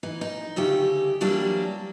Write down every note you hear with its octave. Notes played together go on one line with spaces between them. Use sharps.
E3 D#4
D#4
D2 C#3 A3 G4
E3 F#3 G3 A#3 D4